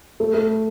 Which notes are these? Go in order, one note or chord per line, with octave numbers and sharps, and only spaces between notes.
A3
A3